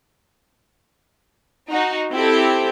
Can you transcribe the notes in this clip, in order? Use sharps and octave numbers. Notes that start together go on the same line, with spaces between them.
D#4 F#4
C4 E4 G4 A4